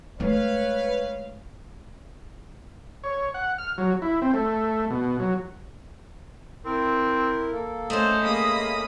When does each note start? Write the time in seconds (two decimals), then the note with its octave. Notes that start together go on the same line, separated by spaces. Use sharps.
0.20 G#3 A3 B4 C#5 F5
3.04 C#5
3.34 F#5
3.58 F6
3.78 F#3
4.02 E4
4.22 C4
4.34 A3
4.90 B2
5.19 F#3
6.65 C4 E4 A#4
7.52 A#3 A4
7.90 A3 C#4 C5 D#5
8.22 G#3 A#3 B5 D#6